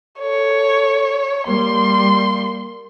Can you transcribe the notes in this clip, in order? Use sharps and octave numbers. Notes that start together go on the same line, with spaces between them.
A4 C#5
G3 A#3 C6